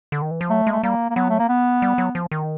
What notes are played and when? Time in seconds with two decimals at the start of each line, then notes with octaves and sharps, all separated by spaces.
0.12 D3
0.22 D#3
0.31 E3
0.41 F3
0.50 F#3 A3
0.67 G#3
0.72 A3
0.83 G3 A#3
1.10 A#3
1.15 F#3 B3
1.30 A3
1.39 A#3
1.49 B3
1.82 G3
1.98 F#3
2.15 F3
2.31 D#3